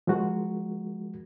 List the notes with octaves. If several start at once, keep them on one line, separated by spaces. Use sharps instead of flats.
F3 G#3 F#4 A#4